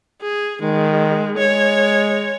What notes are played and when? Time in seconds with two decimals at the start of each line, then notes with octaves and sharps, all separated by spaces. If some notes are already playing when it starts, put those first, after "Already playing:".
0.22 G#4
0.62 D#3 G#3
1.37 G#3 C#5